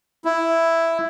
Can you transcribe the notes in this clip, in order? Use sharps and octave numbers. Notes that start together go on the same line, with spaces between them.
E4